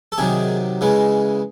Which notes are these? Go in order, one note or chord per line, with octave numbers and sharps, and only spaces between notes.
A4
C3 D#3 F#3 G#4
C#3 E3 G#3